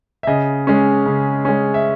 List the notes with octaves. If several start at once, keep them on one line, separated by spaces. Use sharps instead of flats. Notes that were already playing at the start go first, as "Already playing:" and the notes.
E5
C#3 D#5
G#3 C#4
C#3
G#3 C#4
E5